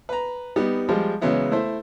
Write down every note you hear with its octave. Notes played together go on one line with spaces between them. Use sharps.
B4 A#5
G3 B3 D#4
F3 G3 G#3
C#3 E3 F#3 G#3 B3 E4
A3 E4 C5